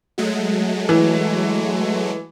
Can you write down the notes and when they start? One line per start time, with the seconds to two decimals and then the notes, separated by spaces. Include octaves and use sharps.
0.18 F#3 G#3 A3
0.89 E3